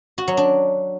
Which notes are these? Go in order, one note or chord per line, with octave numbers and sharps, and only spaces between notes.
F#4
F#3
D4